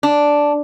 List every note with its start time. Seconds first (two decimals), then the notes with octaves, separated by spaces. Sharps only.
0.03 D4